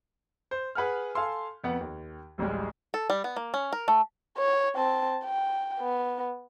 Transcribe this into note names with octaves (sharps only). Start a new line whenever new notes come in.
C5
G#4 B4 F#5 G#5 F6
A4 F5 G#5 A5 C6 E6
F2 B3 F#5
D#2
D1 A1 G3 G#3
A4
G3
B3
A#3
C#4
A#4
A3
C#5
C4 A5
G5
B3